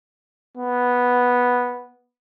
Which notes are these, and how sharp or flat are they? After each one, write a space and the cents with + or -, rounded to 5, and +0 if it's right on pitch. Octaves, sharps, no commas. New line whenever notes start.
B3 -5